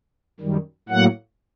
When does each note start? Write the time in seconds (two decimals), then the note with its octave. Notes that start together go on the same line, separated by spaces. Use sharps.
0.40 F#2 D#3 G3
0.89 A2 F#3 A#3 F#5